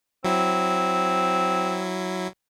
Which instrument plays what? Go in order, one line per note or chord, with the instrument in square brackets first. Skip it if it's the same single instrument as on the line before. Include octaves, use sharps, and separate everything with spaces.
[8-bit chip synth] F#3 E4 [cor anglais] C4